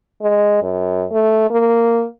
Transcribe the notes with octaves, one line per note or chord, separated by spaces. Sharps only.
G#3
F#2
A3
A#3